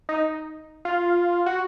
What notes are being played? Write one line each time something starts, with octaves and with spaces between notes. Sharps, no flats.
D#4
F4
F#4